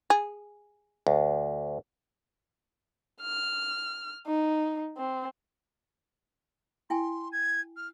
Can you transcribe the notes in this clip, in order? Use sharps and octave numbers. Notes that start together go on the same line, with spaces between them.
G#4
D2
F6
D#4
C4
E4 G5 G#5 C6
G#6
F6